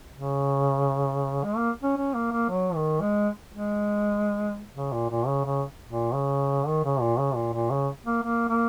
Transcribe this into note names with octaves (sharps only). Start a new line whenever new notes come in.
C#3
G#3
A#3
C#4
C#4
A#3
A#3
F#3
D#3
G#3
G#3
C#3
A#2
A#2
C#3
C#3
A#2
C#3
D#3
C#3
A#2
C#3
A#2
A#2
C#3
A#3
A#3
A#3